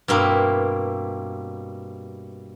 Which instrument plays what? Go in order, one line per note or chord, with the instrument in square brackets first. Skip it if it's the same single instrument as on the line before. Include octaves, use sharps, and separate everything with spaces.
[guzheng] G2 B2 A#3 C4 E4